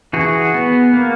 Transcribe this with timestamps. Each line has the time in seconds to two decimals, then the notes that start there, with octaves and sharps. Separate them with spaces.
0.13 E3 F#4 G#4
0.54 B3
0.93 A#3